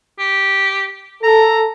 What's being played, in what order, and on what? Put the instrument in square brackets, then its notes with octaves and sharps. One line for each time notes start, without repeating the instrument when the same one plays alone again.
[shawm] G4
[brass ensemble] A4 [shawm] A#5